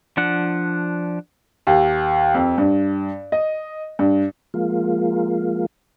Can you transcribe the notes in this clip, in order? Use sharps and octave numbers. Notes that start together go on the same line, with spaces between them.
F3 D4 F#5
D#2
F2
G2
D#5
G2
F3 G#3 A#3 F4